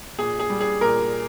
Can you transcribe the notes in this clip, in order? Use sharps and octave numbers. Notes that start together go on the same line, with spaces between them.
A#2 G#4
G#4
G3
G#4
A#2 A#4